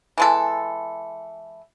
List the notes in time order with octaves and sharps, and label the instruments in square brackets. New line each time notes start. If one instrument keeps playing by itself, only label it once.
[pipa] E3 G#3 A4